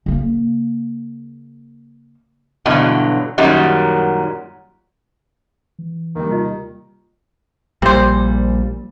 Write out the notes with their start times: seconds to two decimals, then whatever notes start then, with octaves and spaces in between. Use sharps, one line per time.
0.06 C#3 A#3
2.65 G2 B2 D3 E3 F#3
3.38 F#2 A#2 D#3 F#3 G3
5.79 E3
6.15 D#2 D#3 G3
6.31 C3 D#4 F4 D#5
7.82 A#1 A#2 G3 C4 C5